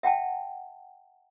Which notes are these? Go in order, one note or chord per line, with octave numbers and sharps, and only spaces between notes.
E5 F#5 G5 A5